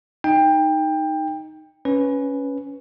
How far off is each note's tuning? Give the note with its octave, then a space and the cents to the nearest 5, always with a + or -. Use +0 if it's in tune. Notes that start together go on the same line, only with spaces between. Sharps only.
D#4 +0 G5 +20
C#4 +5 B4 +0